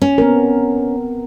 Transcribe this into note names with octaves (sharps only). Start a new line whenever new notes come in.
C#4
B3 C4 A#4